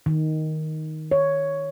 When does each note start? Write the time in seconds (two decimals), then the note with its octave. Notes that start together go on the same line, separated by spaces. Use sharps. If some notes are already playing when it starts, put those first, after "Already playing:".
0.06 D#3
1.11 C#5